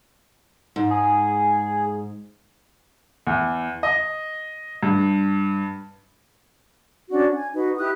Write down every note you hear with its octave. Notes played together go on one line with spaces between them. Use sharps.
G#2
G#4
E2
D#5
G2
C#4 D4 F#4 D5
G#5
D#4 F#4 B4
E4 G4 D#6 F#6